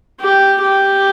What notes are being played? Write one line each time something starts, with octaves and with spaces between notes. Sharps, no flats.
G4
G4